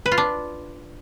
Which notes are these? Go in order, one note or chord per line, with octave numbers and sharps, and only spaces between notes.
B4
F4
D4